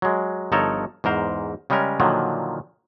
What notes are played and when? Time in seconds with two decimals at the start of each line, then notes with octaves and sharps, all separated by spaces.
0.02 F#3 G#3
0.52 G1 F3 D#4 A4 A#4 C#5
1.04 E2 G#2 A#4 C5
1.70 C#3 G3 G#3 C#4 A#4
2.00 A#2 D3 D#3 F3 F#3